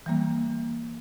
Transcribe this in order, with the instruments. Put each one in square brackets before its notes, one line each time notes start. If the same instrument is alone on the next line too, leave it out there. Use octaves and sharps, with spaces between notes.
[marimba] E3 G3 A#3